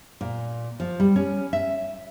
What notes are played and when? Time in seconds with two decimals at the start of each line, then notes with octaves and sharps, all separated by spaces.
0.21 A#2
0.80 F3
1.00 G3
1.16 C#4
1.53 E5